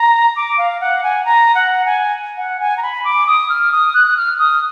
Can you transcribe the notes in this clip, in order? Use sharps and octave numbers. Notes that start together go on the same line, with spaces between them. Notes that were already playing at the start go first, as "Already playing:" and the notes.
Already playing: A#5
D6
F5
F#5
G#5
A#5
F#5
G#5
F#5
G#5
A#5
B5
D6
D#6
F6
D#6
F#6
F#6
F6
D#6